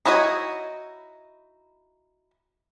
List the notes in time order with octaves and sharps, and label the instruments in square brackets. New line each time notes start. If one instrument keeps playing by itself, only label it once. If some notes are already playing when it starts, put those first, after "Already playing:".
[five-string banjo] D#4 E4 F#4 C#5 D#5